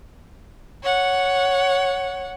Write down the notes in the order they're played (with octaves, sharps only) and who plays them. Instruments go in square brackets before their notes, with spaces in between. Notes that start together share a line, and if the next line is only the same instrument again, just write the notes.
[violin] C#5 F#5